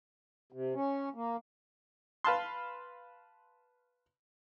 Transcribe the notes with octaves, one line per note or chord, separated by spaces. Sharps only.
C3
C#4
A#3
B4 F5 A5 C6